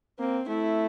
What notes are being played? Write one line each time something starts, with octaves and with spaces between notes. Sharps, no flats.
A#3 C4
A3 E4